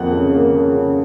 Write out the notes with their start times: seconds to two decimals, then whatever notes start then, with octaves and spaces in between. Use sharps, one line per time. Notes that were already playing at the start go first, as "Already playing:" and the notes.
Already playing: F2 F3 A#3 F#5
0.12 C#3
0.33 A#3
0.53 C#3
0.74 C#3